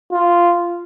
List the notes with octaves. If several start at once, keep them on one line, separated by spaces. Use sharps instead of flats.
F4